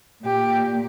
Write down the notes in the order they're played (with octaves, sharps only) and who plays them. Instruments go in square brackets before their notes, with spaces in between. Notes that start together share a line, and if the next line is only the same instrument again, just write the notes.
[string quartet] A#2 G4